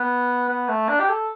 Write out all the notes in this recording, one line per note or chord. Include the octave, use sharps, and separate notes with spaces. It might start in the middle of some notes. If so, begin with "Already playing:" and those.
Already playing: B3
B3
A3
D4
G4
A4